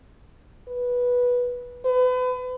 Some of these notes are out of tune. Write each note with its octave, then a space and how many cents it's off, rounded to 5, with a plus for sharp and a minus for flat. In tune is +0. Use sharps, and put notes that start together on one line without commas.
B4 -10
B4 +35